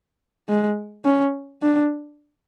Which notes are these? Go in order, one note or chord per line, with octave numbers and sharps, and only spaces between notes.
G#3
C#4
D4